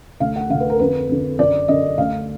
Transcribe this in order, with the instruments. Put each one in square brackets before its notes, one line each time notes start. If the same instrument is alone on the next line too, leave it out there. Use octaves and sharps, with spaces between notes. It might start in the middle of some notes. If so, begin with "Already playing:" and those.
[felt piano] D2 D3 F5
F#5
D3 F5
D2
B4
A#4
F2 D3 B4
F2 D3
F#2 D3 D5
F#2 D3 D#5
D2 D3 F5